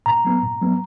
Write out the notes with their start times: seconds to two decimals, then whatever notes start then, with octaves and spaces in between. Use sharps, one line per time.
0.06 A#2 A#5
0.25 F#3 B3
0.43 A#2
0.61 F#3 B3